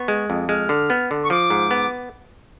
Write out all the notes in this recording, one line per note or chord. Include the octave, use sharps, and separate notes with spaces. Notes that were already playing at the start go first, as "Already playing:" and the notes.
Already playing: B3 C#6
G#3
F2
G#3 F6
D3
B3
D3
C#6
F3 D6
G#2
B3